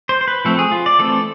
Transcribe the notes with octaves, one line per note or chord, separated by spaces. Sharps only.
C5
C5
B4
F3 A3 C4 A4
G#4
F4
D5
E3 A3 C4 A4